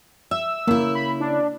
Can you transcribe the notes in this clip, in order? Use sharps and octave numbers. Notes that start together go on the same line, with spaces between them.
E5 E6
C#3 A#3 E4
B5
D4